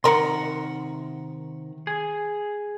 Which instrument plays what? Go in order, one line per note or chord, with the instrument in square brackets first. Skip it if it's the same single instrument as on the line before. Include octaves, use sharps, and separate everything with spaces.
[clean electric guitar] C3 D#3 F#5 [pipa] A#4 C6
[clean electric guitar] G#4